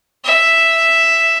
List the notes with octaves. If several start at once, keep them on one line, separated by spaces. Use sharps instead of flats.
E5